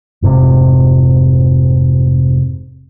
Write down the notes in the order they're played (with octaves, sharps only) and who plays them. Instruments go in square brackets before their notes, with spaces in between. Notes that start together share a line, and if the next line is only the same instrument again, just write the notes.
[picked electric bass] F1 G#2 C3